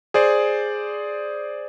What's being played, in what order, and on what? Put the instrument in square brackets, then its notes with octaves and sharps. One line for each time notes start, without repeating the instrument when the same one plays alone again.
[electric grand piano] G#4 C5 D5